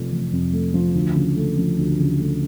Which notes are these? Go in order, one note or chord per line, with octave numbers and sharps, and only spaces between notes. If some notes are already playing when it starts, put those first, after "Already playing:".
Already playing: F1 F2 F3 A3
F1
F2
A3
F3
D2
C#3
A3
F3
D2
C#3
A3